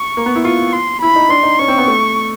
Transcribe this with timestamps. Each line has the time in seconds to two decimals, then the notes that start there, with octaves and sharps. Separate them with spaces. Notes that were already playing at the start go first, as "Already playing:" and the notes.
Already playing: C#6
0.17 A#3
0.26 B3
0.36 E4
0.45 F4 C#6
0.73 C6
1.02 E4 B5
1.16 D#4
1.29 D4 C6
1.43 D#4
1.59 C#4 C#6
1.68 C4
1.78 B3
1.88 A3